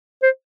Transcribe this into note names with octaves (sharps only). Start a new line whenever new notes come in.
C5